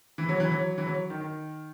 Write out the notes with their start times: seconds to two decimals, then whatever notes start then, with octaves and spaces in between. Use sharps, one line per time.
0.18 E3
0.29 F#3
0.40 E3
0.52 F#3
0.78 E3
0.87 F#3
1.10 D#3
1.21 D#3